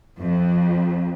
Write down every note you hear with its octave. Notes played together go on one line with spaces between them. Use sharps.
F2